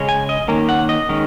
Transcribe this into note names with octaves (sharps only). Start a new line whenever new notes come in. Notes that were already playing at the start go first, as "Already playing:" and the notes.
Already playing: C#3 G#3 C#4
G#5
D#5
D#3 A#3 C#4
F#5
D#5
D#3 G#3 C#4